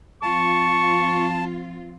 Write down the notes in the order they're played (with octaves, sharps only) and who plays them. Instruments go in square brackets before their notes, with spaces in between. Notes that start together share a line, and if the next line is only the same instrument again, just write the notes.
[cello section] F3 C4 F4 [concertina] A5 [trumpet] C#6